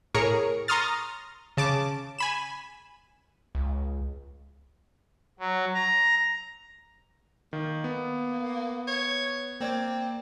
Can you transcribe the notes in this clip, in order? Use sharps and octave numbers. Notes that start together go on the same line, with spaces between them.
A2 G#4 A#4 C#5 C#7
A#5 C6 C#6 D#6 F6 A6
C#3 A5 D6
G#5 B5 E7
C#2
F#3
A#5
D#3 A#3
B3
C#5
A#3 C4 D5 G#6